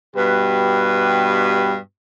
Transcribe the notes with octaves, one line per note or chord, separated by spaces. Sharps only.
G2 B2 G4 B4